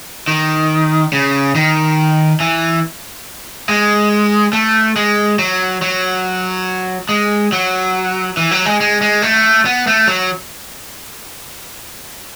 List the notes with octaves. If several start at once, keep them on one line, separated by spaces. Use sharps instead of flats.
D#3
C#3
D#3
E3
G#3
A3
G#3
F#3
F#3
G#3
F#3
E3
F#3
G#3
G#3
G#3
A3
B3
A3
F#3